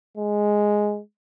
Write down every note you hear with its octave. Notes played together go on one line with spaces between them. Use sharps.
G#3